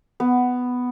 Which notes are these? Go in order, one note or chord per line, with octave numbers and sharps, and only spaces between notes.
B3